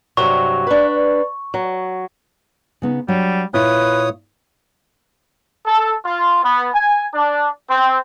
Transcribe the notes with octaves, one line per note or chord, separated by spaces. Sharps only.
G2 C3 F#3 C#6
D4 B4
F#3
C#3 B3 D#4
F#3 G3 D4 C#5
A#2 E4 F4 B4 C#5 D#6
A4
F4
B3
G#5
D4
C4